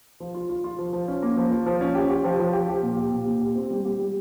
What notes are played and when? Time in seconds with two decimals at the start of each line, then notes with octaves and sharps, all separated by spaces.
0.20 F3
0.34 F4
0.50 F4
0.64 F4
0.79 F3
0.93 F3
1.08 C#4
1.22 A#3
1.37 F3
1.51 F3
1.66 F3
1.81 C#4
1.95 G4
2.10 G4
2.24 F3
2.39 F3
2.53 G4
2.68 G4
2.82 A#2
2.97 G4
3.12 A#2
3.27 A#2
3.41 G4
3.55 C4
3.71 G3
3.85 G4
3.99 G3